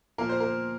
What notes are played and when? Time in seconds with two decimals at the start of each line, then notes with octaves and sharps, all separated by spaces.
0.18 A#2 F3 A#3 A#4
0.29 C5
0.40 A#4